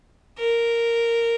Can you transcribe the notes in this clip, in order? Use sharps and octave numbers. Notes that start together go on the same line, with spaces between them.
A#4